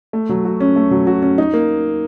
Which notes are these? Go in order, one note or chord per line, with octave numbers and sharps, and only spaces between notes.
A3
F#3
F#4
C#4
A3
F#3
F#4
C#4
D#4
A#3